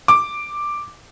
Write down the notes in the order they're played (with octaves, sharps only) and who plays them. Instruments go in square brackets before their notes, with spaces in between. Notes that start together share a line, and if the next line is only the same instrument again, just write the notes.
[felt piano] D6